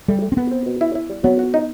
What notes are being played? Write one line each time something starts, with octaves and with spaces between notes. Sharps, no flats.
G3 A3
A3
C4
B3 B4
C4
B2
E4
E4
G3
F#3 B3
F#4
D#4